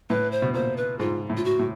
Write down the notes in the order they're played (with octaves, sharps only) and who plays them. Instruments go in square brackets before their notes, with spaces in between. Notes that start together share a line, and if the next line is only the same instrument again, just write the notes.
[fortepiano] A2 [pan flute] B4
[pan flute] C5
[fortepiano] B2
[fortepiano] A#2 [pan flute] C5
[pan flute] B4
[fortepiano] G#2 [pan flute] F4
[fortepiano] A2
[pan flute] F4
F#4
[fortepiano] A2